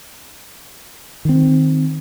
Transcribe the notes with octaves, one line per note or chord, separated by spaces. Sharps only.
D#3 C4